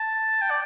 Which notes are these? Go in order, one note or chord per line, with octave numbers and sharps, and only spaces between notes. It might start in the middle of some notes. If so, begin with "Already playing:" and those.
Already playing: A5
G5
D5